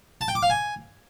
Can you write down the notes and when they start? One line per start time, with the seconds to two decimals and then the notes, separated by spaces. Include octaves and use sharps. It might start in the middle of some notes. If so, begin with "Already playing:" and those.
0.21 A5
0.28 G5
0.35 D6
0.43 F5
0.50 G#5